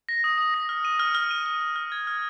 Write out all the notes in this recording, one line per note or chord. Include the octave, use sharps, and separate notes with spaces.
A#6
D#6
D#6
A#6
F6
D#7
F6
F6
D#7
F6
F6
F6
G#6
F6